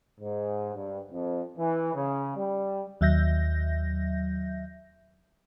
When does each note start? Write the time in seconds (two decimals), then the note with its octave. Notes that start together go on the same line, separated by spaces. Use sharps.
0.21 G#2
0.75 G2
1.11 F2
1.58 E3
1.94 C#3
2.36 G3
3.01 D#2 F#3 E5 G6 A#6